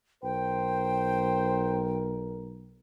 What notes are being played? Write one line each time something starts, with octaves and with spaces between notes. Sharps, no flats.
B1 A#4 C5 G5